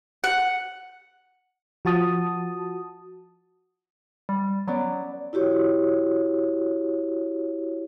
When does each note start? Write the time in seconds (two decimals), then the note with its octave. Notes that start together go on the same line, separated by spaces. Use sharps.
0.24 F#5
1.85 F3 F#4 A5 D#6
4.29 G3
4.68 F#3 B3 C#4 D5
5.33 E4 F#4 G4 C#5